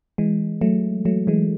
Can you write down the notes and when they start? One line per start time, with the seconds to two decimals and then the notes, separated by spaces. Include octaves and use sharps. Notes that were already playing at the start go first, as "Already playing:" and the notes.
0.18 E3 G#3
0.61 F#3 A3
1.05 F#3 A3
1.27 E3 G#3